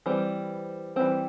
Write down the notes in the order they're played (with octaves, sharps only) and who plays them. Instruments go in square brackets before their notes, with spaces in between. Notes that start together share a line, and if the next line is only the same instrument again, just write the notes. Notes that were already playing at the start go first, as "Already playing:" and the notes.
[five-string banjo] E3 G3 C4
E3 G3 C4